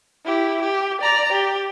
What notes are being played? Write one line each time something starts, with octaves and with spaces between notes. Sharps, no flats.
E4 G4
G4
D5 A#5
G4